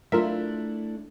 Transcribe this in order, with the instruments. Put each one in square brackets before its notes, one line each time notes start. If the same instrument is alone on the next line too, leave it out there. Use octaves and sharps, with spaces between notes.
[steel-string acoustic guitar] A3 D4 E4 [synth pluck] F4 A#4 E5